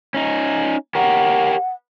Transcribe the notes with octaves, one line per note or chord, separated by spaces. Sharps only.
C#4 D#4
G4 A#4 C#5 F#5